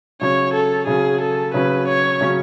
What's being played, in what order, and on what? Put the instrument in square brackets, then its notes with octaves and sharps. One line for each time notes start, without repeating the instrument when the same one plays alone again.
[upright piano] C#3 F#3 C#4 [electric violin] C#5
[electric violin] A4
[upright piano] C#3 F#3 C#4 [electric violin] G#4
[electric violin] A4
[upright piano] C#3 F#3 C#4 [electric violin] B4
[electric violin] C#5
[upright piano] C#3 F#3 C#4